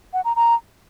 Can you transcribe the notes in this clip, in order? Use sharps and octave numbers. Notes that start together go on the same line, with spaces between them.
F#5
A#5
A#5